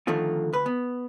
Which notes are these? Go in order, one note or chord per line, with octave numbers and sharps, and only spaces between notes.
D3 D#3 F3 A3 C4 F4
D2 B4
B3